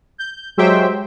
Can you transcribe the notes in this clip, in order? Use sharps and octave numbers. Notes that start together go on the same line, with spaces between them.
G6
F#3 G#3 G4 C5 E5 G5